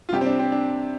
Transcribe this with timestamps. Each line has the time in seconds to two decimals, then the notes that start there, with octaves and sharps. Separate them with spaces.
0.09 F4
0.13 C3 G3 G4
0.21 C4
0.26 D4
0.39 C4
0.52 D4